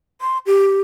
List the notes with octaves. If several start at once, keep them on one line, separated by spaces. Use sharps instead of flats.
C6
G4